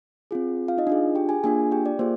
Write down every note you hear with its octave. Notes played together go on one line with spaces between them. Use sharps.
C4 F4 G#4
F4 F5
D#4 D#5
D4 F4 G#4
G4 G5
G#4 G#5
A#3 D4 F4 G#4 G#5
G4 G5
D5
A#3 F4 G#4 C5